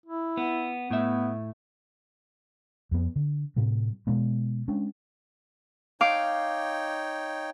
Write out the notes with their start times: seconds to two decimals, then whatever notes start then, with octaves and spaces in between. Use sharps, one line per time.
0.06 E4
0.37 B3
0.91 A2 B3 E5
2.91 F2 B3
3.16 D3
3.56 A2 C3 G3
4.07 B2 G#3 B3
4.68 G#3 C#4 D4
6.01 D#4 C#5 F5 G5 D6